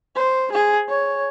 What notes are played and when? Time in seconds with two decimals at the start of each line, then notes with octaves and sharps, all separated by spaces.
0.16 C5
0.52 G#4
0.89 C#5